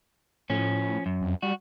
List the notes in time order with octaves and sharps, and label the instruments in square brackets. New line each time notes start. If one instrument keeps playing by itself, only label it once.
[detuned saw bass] A2 [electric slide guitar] F3 C#4
[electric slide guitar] F#2
[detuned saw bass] F2
[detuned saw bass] G3 [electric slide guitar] F#4